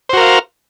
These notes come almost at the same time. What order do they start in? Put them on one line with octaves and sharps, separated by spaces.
C5 F#4 A#4 F5